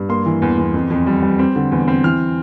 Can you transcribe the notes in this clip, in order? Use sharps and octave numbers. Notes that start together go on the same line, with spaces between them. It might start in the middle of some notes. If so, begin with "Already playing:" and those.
Already playing: G2
A#3 C6
E3
E2
E2
F2
F2
G3
G3
C4
D3
E2
C4
E3 F6